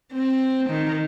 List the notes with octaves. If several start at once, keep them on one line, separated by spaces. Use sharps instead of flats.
C4
D#3